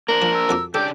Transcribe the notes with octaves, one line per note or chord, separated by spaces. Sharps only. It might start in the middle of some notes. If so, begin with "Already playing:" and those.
A#3 D4 A#4 C5 F#7
F3
E6
F2 F#4 D6
C#3 D4 G4 A4 D5 G6